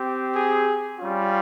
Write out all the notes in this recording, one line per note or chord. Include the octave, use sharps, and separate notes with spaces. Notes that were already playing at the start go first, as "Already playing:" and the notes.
Already playing: C4 G4
G#4
G3 C#4 F4